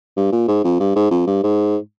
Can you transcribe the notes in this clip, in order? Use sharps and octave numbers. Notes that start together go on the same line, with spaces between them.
G2
A#2
G#2
F2
G2
G#2
F2
G2
G#2